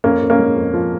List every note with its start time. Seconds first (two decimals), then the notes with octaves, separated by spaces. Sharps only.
0.04 F2 A#3 C#4
0.21 F2
0.30 A#3 C#4
0.39 G#3
0.56 F2
0.73 F3